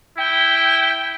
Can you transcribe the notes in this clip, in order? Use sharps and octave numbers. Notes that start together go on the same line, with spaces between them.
E4 G5